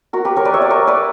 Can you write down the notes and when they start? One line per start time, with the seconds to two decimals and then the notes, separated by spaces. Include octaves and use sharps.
0.13 F#4 A#4
0.25 G4 B4
0.36 A#4 C#5
0.45 B4 D5
0.54 C#5 E5
0.62 D5
0.70 A#4 C#5
0.87 B4 D5